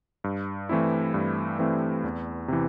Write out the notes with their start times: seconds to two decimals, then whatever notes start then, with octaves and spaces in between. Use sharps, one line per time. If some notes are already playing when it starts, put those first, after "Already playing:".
0.24 G2
0.69 E3 A3 C4 E4
1.14 G2
1.59 E3 A3 C4 E4
2.04 E2
2.48 C3 E3